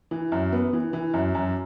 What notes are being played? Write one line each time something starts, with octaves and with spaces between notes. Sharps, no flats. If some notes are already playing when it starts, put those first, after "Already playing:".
E3
F#2
B3
E3
E3
F#2
F#2